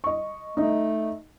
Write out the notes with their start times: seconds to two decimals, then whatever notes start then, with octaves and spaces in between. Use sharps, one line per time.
0.04 D#5 C#6
0.57 A3 D#4 D#5